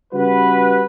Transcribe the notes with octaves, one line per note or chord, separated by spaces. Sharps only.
C#3 G3 F#4 G4 B4